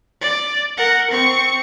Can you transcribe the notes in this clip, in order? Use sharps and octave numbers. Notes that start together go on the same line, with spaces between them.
D5
A#4 F#5
C4 C#6